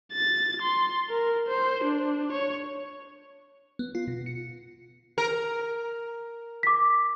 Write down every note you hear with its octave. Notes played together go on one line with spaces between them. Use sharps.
A6
C6
A#4
C5
D4
C#5
B3
F4
B2
C#7
A#4
D6 B6